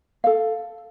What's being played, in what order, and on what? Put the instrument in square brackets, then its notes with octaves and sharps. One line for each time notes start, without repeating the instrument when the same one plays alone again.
[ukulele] A4 F5